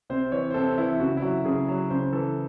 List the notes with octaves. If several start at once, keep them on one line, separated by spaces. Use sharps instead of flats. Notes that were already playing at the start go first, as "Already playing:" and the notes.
C3 C5
E3 C#5
C5
C3 A4
E3 E4
C#3 F#4
E4
F#3 F#4
C#3 G#4
F#3
C#3 C5
E3 A4